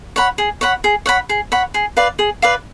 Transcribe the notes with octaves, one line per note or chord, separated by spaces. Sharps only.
C#5 F#5 B5
G#4
C#5 F#5 B5
G#4
C#5 F#5 B5
G#4
C#5 F#5 B5
G#4
B4 D5 F5
G#4
B4 D5 F5